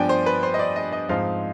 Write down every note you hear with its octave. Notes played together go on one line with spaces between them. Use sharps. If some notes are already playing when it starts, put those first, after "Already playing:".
Already playing: G2 F3 B3 D4 G5 G#5
C5
B4
C5
D#5
D5
D#5
D#5
G#2 F3 C4 D#4 F5